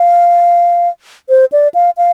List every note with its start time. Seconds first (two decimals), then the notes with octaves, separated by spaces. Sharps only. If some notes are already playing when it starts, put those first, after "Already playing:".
Already playing: F5
1.29 C5
1.52 D5
1.74 F5
1.97 F5